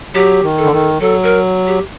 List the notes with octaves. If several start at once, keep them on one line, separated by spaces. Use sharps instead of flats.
F#3 G4
D#3
A4
D3
D#3
F#3 A4
A#4
G4